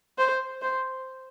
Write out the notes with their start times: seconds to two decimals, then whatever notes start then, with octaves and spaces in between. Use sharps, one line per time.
0.18 C5
0.62 C5